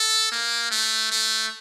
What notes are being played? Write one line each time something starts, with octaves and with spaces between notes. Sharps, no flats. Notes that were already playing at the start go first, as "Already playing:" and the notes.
Already playing: A4
A#3
A3
A3